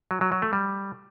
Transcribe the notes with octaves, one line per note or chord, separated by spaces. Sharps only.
F#3
F#3
F#3
A3
G3